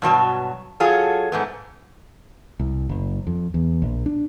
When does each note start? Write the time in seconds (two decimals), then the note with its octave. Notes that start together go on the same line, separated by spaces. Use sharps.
0.02 G2 B2 F#3 A5
0.80 F#3 F4 G#4 A4
1.32 G#2 A3 B3
2.60 C2
2.89 F#1
3.27 F2
3.54 E2
3.82 A#1
4.06 D4